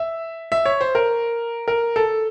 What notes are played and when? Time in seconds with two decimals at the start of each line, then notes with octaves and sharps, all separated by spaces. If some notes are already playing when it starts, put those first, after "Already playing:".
Already playing: E5
0.52 E5
0.66 C#5
0.81 C5
0.95 A#4
1.68 A#4
1.96 A4